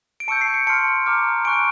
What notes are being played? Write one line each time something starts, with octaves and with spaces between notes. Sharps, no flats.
D7
A5 C#6 E6 G6 C#7
C7
C#7
A5 C6 F6 C#7
A#5 D6 F6
G#5 C#6 F#6 D7